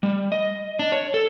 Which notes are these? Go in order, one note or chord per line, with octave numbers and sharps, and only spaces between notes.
G3
D#5
D4
C#5
A4